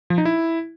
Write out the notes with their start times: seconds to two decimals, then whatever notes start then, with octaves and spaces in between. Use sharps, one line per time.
0.10 F3
0.18 D#4
0.25 E4